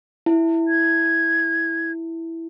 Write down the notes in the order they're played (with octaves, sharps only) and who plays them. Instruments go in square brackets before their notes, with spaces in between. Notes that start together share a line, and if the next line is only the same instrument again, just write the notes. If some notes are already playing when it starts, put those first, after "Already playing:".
[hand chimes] E4
[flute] G#6